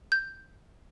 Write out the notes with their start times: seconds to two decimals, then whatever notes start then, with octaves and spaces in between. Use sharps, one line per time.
0.12 G6